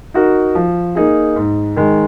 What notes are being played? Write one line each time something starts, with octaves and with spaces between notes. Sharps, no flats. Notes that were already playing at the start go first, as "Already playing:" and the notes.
D#4 F#4 A#4
F3
A#3 D#4 G#4
G#2
D#3 G#3